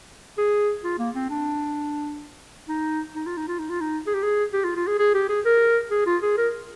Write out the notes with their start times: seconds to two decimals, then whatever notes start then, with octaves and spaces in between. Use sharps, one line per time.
0.38 G#4
0.84 F4
0.99 A#3
1.15 C4
1.30 D4
2.68 D#4
3.15 D#4
3.26 F4
3.37 D#4
3.48 F4
3.59 D#4
3.69 F4
3.81 D#4
4.07 G#4
4.14 G4
4.23 G#4
4.53 G4
4.64 F4
4.76 F4
4.87 G#4
4.99 G#4
5.14 G4
5.29 G#4
5.45 A#4
5.91 G#4
6.06 F4
6.22 G#4
6.37 A#4